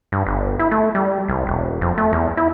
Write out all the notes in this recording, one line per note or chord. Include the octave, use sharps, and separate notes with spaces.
G2
G1
E4
A3
G3
C2
E1
F2
A3
E2
E4